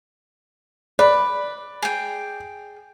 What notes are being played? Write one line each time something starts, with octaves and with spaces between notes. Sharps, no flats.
B4 D5
G#4 G5